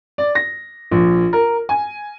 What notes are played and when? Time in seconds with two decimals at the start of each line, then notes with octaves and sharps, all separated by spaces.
0.18 D5
0.35 A#6
0.91 A#1
1.33 A#4
1.69 G#5